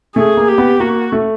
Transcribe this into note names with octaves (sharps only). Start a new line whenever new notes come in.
A3 G#4
A#3
G4
B3
A#3 F#4
A3